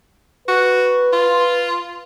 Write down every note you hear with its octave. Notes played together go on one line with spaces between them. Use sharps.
F#4 B4
F4